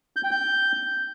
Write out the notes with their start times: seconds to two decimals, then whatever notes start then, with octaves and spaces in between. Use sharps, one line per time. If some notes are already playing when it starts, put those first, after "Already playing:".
0.16 G6
0.24 G5
0.31 G6